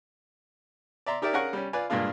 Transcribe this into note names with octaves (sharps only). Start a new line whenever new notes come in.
D5 E5 A#5 C6
D#4 G4 A#4 D5 E5
C#4 G#4 A#4 F5 F#5 C#6
G3 C#4
F4 B4 D5 F5 G#5
G2 A#2 G#3 A#3 D4 F4